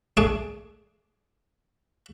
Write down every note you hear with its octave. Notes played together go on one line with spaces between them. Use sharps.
A3 D4 G#4 G#5 A5 D6